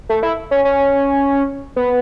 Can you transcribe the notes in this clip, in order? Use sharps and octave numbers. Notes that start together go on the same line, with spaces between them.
A3
E4
C#4
C#4
B3